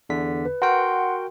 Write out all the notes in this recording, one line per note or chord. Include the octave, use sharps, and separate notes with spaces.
E2 D3 B6
B4
F#4 A#4 F#5 G5 C6